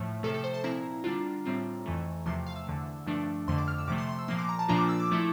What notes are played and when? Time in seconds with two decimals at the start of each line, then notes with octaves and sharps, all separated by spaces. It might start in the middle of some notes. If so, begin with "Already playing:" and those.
Already playing: A2 F3 A3
0.23 C3 F3 A3 A4
0.34 A4
0.44 C5
0.54 A5
0.64 A#2 F3 C4 E4 A#5
1.04 D3 G3 D4 F4
1.45 A2 G3 C4 F4
1.86 F2 E3 A3
2.26 E2 C3 F3 A3 C6
2.46 F5
2.56 E6
2.67 E2 D3 A3
3.06 G2 F3 A3 D4
3.48 F2 D3 A3 C6
3.58 D6
3.68 F6
3.79 E6
3.88 C3 F3 A3 D6
3.98 C6
4.09 C6
4.19 E6
4.28 A#2 F3 A#3 C6
4.39 D6
4.49 A#5
4.59 A5
4.68 A#2 F3 A#3 D4 F4 A#5
4.79 D6
4.89 E6
5.00 D6
5.11 F3 A3 E4